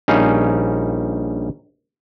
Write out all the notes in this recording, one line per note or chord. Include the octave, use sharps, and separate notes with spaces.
A#1 G3 C#4 D#4 F5